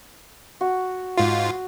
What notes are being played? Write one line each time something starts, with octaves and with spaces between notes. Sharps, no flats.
F#4
G#2 F4